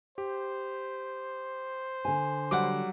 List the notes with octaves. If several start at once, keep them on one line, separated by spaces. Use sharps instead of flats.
G4 C5
D3 G#5
F#3 G3 F#5 D6